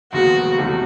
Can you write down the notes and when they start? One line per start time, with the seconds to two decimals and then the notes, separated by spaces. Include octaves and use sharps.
0.12 F1 D#2 D#3 G#3 B3 F#4
0.57 E2 C3 D#3 F#3 A3